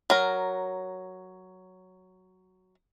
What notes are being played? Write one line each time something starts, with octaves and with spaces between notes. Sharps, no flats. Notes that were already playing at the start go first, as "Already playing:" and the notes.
F#3 A#4